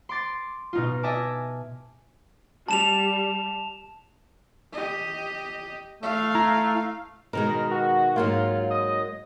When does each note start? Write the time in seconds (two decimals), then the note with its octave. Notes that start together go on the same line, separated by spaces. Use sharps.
0.09 C6 D6 A6 C7
0.73 B2 D#4 F4
1.03 D#5 E5 G#5 A5 D6
2.68 G3 A5 E7 F7
4.72 G4 D#5
6.03 A3 F5
6.35 E4 A#5
7.33 B2 D#3 G#3 A#4
7.71 F#4
8.16 G#2 F#3 A#3 F4
8.70 D#5